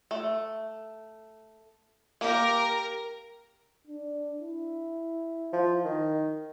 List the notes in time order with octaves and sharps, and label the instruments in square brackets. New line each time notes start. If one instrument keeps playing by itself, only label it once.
[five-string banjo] A3
[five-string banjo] A#3 G4 [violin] A#4 A#5
[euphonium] D4
E4
[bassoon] F3
D#3